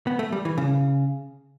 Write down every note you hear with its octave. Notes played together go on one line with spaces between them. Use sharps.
B3
A3
G3
E3
C#3